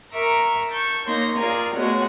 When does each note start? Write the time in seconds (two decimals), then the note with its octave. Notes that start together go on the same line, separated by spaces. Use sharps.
0.12 A#4 E5 A#5 C#6 D6
0.71 A5 C#6 G6
1.06 A#3 D#4 C#5 C6 A#6
1.37 F4 G#4 A#4 D5 G#5 A#5
1.74 G#3 A3 B3 F#4 C#5 F#5